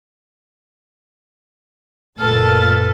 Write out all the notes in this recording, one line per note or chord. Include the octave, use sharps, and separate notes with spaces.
F#1 A#2 A4 B4 A5 F6 A6